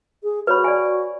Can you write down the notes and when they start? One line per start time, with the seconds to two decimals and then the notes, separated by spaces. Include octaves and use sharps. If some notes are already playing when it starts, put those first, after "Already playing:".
0.23 G#4
0.47 F#4 B4 C#5 B5
0.64 D5 G#5